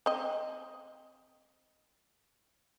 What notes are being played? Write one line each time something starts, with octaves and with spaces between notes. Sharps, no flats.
C4 D#5